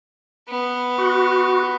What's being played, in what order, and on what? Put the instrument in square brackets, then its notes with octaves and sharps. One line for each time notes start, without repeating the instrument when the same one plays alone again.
[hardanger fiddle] B3
[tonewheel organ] F#4